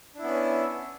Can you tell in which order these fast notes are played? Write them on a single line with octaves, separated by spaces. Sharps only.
D4 E4 B3 C#4